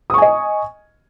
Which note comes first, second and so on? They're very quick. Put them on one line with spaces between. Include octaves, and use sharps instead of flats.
D#6 C#6 G#5 D#5